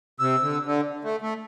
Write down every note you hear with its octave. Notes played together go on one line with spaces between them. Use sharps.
C3 E6
D3
D3
A3
A3